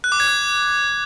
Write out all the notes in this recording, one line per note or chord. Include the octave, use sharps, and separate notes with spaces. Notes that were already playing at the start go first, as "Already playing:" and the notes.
F#6
D6
G#6
F#6